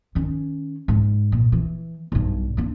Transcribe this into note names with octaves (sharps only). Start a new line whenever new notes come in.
D#3 C#4
G#2
A#2
E3
B1 G2
A#3 D4